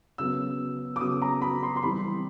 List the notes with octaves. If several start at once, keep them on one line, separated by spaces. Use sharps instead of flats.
C#3 F#3 B3 E6
D6
C#3 F#3 B3 D#6
A#5
B5
C6
C6
E3 G3 C4 B5